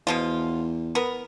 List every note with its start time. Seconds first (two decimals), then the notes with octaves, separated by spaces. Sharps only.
0.07 E2 B2 F3 F4
0.95 B3 A#4